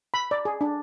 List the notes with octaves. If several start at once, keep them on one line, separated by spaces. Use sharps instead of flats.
B5
D5
G#4
D4